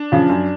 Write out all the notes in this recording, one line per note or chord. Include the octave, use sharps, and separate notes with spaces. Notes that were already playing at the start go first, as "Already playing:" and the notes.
Already playing: D4
C#3 F3
F#2